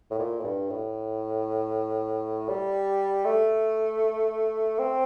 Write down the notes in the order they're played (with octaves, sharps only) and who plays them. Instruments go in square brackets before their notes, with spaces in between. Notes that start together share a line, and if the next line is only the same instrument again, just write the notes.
[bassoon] A2
A#2
A2
G2
A2
G3
A3
C4